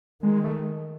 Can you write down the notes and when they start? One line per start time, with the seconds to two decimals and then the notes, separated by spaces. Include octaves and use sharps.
0.22 D#3 G#3
0.44 A3